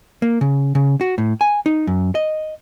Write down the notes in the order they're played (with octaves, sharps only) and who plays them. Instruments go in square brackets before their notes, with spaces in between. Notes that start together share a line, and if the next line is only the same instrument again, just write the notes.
[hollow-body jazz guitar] A#3
C#3
C#3
F#4
A2
G#5
D#4
F#2
D#5